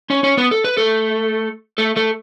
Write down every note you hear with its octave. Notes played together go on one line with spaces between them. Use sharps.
C#4 C#5
C#4 C#5
B3 B4
A4
B4
A3 A4
A3 A4
A3 A4